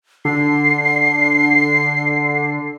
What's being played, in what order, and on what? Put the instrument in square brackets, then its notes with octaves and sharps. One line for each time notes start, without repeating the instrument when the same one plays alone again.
[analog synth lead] D3 [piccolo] C7